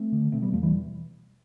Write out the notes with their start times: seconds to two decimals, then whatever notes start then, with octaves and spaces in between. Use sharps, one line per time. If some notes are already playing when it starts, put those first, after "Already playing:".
Already playing: A3 C4
0.12 D3
0.32 B2 A3 C4
0.42 G3 B3
0.53 E2 F3 A3
0.63 E3 G3